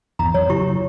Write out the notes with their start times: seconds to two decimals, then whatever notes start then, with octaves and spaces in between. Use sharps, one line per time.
0.19 E2 G#2 A#5
0.34 F2 F#3 C#5
0.50 C#3 F#3 E4 G4 C#6